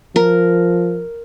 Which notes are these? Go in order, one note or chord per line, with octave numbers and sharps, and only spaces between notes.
F3 A#4